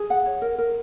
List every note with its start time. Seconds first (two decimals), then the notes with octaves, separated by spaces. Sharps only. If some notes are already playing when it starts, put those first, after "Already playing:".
Already playing: G#4
0.10 F#5
0.26 C#5
0.42 A#4
0.58 A#4